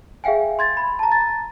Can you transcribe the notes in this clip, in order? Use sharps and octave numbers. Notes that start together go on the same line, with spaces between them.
G#4 E5 F5 G5 G#5
C6 G#6 A6
B5
A5 A#5
A6